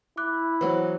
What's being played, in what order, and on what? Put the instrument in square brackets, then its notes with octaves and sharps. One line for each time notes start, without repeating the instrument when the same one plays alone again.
[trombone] E4 [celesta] D6 F#6
[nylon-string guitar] E3 F#3 B3 [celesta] B4 C5